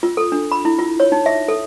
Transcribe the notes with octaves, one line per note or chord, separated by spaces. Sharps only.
F4
A4
D4
B5
E4
F4
C#5
D#4
E5
A4